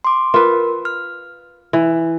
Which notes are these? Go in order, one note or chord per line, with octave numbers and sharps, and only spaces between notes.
C6 D6
F4 A#4 B4
F6
E3